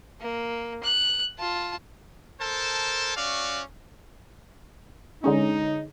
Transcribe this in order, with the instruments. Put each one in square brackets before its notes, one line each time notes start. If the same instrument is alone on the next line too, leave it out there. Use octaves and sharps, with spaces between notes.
[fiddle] A#3
F#6
F4 A5
[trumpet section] A4 A#4 C5 A5
C#4 F#4 D5 F5
[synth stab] D3 G#3 C#4 [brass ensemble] D#4